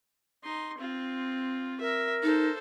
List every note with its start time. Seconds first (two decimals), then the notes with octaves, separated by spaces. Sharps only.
0.44 D#4 C6
0.78 C4 F4
1.80 A#4 E5
2.23 D#4 A4 C5